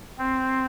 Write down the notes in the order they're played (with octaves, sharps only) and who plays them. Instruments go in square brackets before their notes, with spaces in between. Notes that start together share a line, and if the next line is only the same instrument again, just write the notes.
[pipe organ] C4